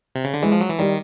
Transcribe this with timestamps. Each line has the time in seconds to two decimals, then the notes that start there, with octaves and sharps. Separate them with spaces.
0.15 C3
0.24 C#3
0.34 D3
0.42 E3 G#3
0.52 F3
0.60 F#3
0.70 E3
0.79 D#3 G3